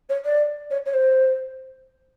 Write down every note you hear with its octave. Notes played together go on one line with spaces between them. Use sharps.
C#5
D5
C#5
C#5
C5